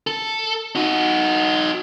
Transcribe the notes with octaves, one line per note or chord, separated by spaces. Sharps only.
A4
D#4 F#4